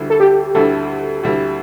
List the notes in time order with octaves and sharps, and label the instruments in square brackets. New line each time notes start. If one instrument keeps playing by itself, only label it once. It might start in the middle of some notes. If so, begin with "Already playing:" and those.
Already playing: [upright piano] D2 D3 G3 E4
[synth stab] A4
G4
[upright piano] D2 D3 G3 E4 [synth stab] A4
[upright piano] D2 D3 G3 E4